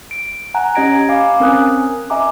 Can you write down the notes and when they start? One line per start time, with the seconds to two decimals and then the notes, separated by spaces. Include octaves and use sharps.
0.11 D7
0.54 F#5 G#5 A#5 F#6
0.75 C#4 G4 D#5 G#6 A#6 D7
1.09 F5 G#5 A#5 B5 D6
1.40 C4 C#4 A#4 G#5 D#6 F#6
2.10 D#5 E5 G#5 A#5 D6